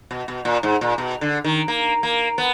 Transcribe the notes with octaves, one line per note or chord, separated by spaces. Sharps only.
B2
B2
A#2
G#2
A#2
B2
D3
D#3
A#3
A#3
B3